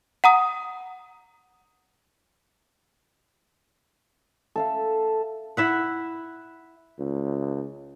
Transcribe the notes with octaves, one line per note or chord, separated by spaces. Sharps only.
F#5 A#5 D#6
A4 E5 F5
E4 E5 F#5
C#2